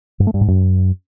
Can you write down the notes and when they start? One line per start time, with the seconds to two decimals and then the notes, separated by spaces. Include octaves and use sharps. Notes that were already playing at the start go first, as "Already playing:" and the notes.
0.20 G2
0.27 A3
0.34 G2
0.41 G#2
0.48 F#2